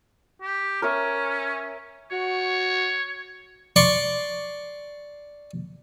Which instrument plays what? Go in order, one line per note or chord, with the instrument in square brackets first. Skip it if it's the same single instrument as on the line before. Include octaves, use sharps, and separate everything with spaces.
[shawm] G4
[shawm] C#4 [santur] A#4 C#5 E5
[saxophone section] F#4 [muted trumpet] C#5
[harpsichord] D5 C6 C#6